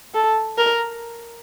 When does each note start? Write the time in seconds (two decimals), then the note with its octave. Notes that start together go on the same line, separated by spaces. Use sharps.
0.14 A4
0.58 A#4